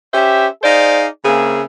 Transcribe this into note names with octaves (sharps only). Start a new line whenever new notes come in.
C#4 G4 C5 E5
D#4 G#4 C5 D5 F5
C#3 A#3 C4 G#4 E5